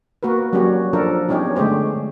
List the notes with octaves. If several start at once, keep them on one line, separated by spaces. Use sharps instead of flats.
A#3 F#4 A#4 B4
F#3 G3 A#3 C#4 F#4 G4
F3 D4 F4 A4 A#4
G3 B3 C#4 D#4 G4 G#4
D3 G#3 A3 G4 C5